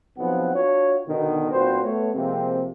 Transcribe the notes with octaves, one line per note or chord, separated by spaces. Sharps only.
B1 F3 B3 C4 F#5
D4 F4 F#4 C#5
B2 D3 D#3
B1 A#2 C4 F#4 B4 C5
A3 B3 C#5
C3 F3 G#3 A#3 C4